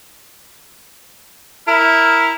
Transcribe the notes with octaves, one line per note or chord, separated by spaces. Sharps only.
E4 A#4 F6